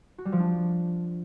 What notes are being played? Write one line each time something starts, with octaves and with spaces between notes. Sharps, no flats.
F#4
G3
F3
D4